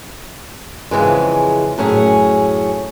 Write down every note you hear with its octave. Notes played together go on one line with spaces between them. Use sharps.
F2 C#3 E3 G#3
F#2 A2 C#4 G#4